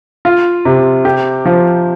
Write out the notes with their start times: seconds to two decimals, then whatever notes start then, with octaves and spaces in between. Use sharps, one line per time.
0.25 F4
0.65 C3
1.05 G4
1.45 F3